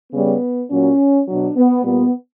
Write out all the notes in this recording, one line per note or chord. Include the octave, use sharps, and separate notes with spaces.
C#3 G3 B3
A#2 F#3 C#4
B2 F#3 D4
B3
A#2 G3 B3